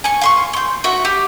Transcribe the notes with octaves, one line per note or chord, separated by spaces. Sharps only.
G#5 C#6
F5 C6 C#6
C6 G6
F#4 E5 F#5
G4